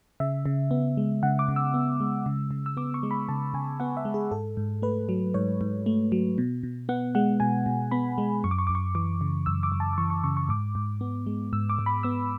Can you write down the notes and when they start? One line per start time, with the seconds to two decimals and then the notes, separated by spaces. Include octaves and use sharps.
0.20 C#3 E5
0.46 C#3
0.71 B3
0.97 G#3
1.23 C#3 F#5
1.39 D6
1.48 C#3
1.56 E6
1.74 B3
2.00 G#3
2.26 C#3
2.51 C#3
2.66 E6
2.77 B3 D6
2.94 C#6
3.03 G#3
3.11 B5
3.29 C#3 A5
3.54 C#3 G#5
3.80 B3 F#5
3.97 E5
4.05 G#3
4.14 G#4
4.31 G#2 A4
4.57 G#2
4.82 A3 B4
5.09 F#3
5.34 G#2 C#5
5.61 G#2
5.86 A3
6.12 F#3
6.38 B2
6.63 B2
6.89 B3 F#5
7.15 G#3 F#5
7.40 B2 G#5
7.66 B2
7.91 B3 B5
8.18 G#3
8.44 F#2 C#6
8.51 D6
8.59 C#6
8.67 F#2 D6
8.75 C#6
8.95 E3 D6
9.21 C#3
9.46 F#2 E6
9.63 D6
9.72 F#2
9.80 A5
9.93 D6
9.98 E3 C#6
10.10 C#6
10.24 C#3 C#6
10.37 C#6
10.49 G#2 D6
10.75 G#2
11.01 B3
11.26 G#3
11.53 G#2 E6
11.70 D6
11.79 G#2
11.86 B5
12.03 B3 E6